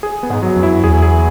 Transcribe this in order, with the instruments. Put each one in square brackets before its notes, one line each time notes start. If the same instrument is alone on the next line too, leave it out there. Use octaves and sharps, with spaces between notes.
[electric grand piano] G#4
B3
[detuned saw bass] G#2
[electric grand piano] F#3
[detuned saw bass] F#2
[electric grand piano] E4
[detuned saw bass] E2 [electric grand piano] G#4
[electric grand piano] G#4